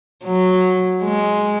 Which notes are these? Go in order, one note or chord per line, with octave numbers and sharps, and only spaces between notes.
F#3
G#3